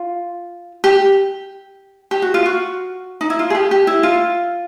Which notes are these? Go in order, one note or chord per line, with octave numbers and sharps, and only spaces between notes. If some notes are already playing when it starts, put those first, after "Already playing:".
Already playing: F4
G4
G4
F#4
F4
F#4
D#4
E4
F4
G#4
G4
G4
E4
F4